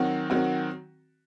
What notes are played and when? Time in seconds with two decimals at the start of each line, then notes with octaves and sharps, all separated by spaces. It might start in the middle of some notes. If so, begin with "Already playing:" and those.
Already playing: D#3 F#3 C4 F#4
0.30 D#3 F#3 C4 F#4